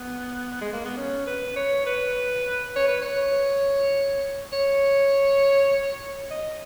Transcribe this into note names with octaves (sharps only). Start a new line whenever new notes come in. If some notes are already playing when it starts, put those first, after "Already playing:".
Already playing: B3
G#3
A#3
B3
C#4
B4
C#5
B4
C#5
B4
C#5
C#5
D#5